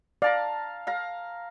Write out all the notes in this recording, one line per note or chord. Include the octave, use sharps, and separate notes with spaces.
D5 F5 A5 A#5
F5 A#5